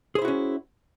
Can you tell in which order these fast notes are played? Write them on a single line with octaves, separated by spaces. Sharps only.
G#4 C5 E4 F#4 C#4